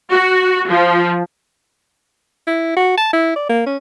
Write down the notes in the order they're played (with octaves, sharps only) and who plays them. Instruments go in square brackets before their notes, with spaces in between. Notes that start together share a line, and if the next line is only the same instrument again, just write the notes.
[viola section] F#4
F3
[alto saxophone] E4
F#4
A5
E4
D5
A#3
C#4